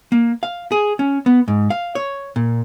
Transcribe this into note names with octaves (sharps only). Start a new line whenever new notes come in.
A#3
F5
G#4
C#4
B3
G#2
F5
C#5
A#2